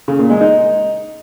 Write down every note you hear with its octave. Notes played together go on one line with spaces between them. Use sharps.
C#3
A#2
G#3
D#4